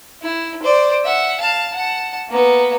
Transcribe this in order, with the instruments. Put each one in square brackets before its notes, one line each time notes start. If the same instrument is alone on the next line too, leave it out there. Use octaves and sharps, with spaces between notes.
[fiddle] E4
C5 D5
E5 F#5
F5 A5
F#5 A5
A#3 B3